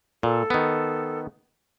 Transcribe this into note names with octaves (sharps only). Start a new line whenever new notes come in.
A#2 A4
D#3 B3